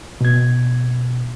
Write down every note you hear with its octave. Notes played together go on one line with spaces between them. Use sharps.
B2 G#6